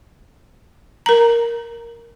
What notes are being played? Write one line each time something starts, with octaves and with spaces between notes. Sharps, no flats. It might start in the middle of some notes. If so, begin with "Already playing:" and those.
A#4 A#5